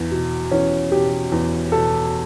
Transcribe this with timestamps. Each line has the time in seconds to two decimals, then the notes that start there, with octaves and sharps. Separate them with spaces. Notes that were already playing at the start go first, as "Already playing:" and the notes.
Already playing: E2
0.11 B2
0.51 E2 C#4
0.92 B2 G4
1.32 E2
1.72 B2 A4